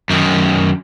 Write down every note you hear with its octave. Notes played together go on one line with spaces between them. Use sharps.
F#2 D#3